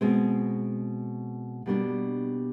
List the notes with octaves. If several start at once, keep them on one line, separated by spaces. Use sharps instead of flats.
B2 G#3 C4
B2 G3 A#3 D4